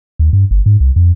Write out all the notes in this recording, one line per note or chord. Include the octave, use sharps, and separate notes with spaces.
D#2
G2
G1
G#2
C2
F2